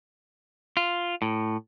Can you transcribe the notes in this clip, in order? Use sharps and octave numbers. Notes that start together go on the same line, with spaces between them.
F4
A2